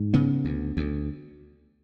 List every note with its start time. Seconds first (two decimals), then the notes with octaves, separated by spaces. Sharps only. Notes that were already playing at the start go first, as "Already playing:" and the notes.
Already playing: G#2
0.14 C#3 B3
0.45 D2
0.77 D2